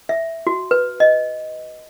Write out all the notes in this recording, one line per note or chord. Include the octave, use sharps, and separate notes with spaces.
E5
F#4
B4
D#5